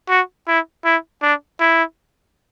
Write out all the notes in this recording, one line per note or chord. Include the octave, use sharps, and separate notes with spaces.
F#4
E4
E4
D4
E4